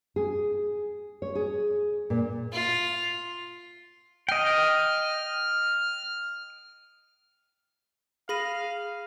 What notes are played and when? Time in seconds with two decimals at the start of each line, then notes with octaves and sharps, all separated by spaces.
0.16 G#4
1.22 C#5
1.35 G#4
2.10 A#2
2.52 F4
4.29 D#5 G5 F6
8.29 G#4 F5 B5 A#6 D#7